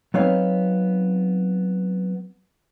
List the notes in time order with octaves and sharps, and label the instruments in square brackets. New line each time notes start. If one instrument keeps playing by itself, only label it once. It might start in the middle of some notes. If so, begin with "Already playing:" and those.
[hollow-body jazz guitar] F#3 B3 C4 D#4 C#5 F5